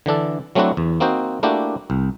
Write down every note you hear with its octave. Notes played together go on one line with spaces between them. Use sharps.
D3 E3 D4 A4
F#3 A3 C4 D4 E4 F#4
E2
A#3 C4 D#4 F#4 C5
A3 A#3 D4 E4 F#4 G4
C2